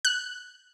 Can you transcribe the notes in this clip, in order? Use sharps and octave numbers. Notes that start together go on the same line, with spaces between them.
F#6